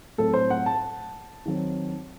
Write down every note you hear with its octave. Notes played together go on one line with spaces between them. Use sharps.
A2 F#3 C4 A4
C5
F#5
A5
D#3 F#3 C4